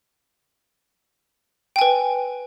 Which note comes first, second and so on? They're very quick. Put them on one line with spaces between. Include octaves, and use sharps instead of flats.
G5 G#5 B4